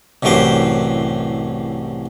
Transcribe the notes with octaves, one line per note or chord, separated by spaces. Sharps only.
C2 F#2 A2 E3 G4 C5